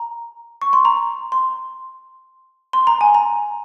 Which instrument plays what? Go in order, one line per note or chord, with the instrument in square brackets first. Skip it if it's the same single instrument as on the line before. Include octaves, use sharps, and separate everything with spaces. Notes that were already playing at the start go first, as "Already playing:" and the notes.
Already playing: [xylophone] A#5
C#6
C6
A#5
C6
C6
A#5
G#5
A#5